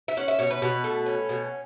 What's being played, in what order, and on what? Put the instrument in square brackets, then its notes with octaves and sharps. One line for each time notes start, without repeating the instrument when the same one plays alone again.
[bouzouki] E5
C#4 F#5
E5
B2 C#5
B4
B2
A3
C#4
B2